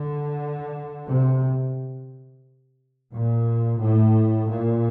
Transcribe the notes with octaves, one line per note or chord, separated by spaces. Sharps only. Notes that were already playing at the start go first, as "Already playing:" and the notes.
Already playing: D3
C3
A#2
A2
A#2